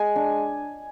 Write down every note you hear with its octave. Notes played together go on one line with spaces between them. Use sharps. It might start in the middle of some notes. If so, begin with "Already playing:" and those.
Already playing: G#3 G#5
D4